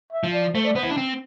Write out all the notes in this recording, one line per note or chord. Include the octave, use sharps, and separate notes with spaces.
E5
F3
D5
A3 C5
D5
B3 C5
E4
D4
C4